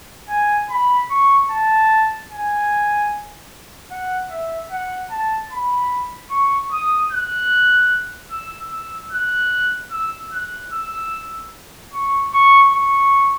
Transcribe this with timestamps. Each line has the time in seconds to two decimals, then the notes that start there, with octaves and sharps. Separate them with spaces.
0.29 G#5
0.70 B5
1.11 C#6
1.51 A5
2.31 G#5
3.91 F#5
4.31 E5
4.71 F#5
5.11 A5
5.52 B5
6.31 C#6
6.72 D#6
7.12 F#6
8.32 E6
8.72 E6
9.13 F#6
9.92 E6
10.33 F#6
10.73 E6
11.93 C#6
12.34 C#6
12.74 C#6